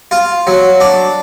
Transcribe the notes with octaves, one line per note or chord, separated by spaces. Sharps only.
F4
F#3
D4